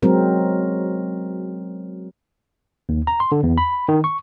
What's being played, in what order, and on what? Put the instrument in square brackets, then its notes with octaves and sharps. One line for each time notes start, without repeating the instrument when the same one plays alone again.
[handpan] F#3 G#3 C4 A#4
[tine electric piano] D#2
A#5
C6
D3
E2
B5
D#3
C#6